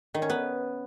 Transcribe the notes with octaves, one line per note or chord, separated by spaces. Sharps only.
D#3
C#4
B3